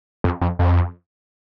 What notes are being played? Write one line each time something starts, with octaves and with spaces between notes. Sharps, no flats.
F2
F2
F2